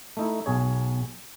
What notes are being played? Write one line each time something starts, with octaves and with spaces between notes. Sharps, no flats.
A3 D#4 E4
B1 G#4 C#5